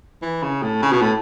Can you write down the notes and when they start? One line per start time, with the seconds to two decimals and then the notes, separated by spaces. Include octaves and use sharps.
0.22 E3
0.43 C#3
0.63 A2
0.82 C#3
0.92 B2
1.02 A2